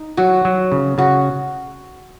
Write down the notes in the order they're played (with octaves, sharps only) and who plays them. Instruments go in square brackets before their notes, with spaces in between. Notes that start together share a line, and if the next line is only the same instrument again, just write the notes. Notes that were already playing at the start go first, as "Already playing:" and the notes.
Already playing: [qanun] D#4
[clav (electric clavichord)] F#3 [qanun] F#4
[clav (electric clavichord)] F#3
C#3
[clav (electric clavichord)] C#3 [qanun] F#4